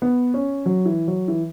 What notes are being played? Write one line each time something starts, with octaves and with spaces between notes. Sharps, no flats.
B3
C#4
F#3
E3
F#3
E3